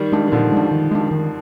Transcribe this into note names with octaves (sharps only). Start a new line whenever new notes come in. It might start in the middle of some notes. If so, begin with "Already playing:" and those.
Already playing: D#3 G3
G#3 D4
D#3
A#2 D3 F3
G#3 D4
D#3
G#3 D4
D#3